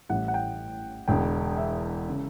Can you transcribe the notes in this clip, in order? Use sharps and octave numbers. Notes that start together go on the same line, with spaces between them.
A1 A2 G3 F#5
F#5
G5
E1 E2 D3 G5
E5
C#3